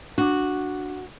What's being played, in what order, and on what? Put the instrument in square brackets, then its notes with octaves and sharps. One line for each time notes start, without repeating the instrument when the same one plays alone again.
[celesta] D4 D6 [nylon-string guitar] F#4